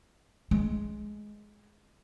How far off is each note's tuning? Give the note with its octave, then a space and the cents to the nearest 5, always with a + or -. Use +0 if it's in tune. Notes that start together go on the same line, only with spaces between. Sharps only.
G#3 +10